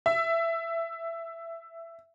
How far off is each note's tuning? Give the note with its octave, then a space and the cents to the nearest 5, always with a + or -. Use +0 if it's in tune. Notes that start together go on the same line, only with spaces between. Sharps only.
E5 +15